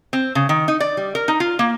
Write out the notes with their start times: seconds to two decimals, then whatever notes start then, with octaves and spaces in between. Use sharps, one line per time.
0.13 C4
0.35 C#3
0.49 D#3
0.68 D#4
0.80 D5
0.97 G3
1.15 A#4
1.28 D#4
1.40 F4
1.59 A#3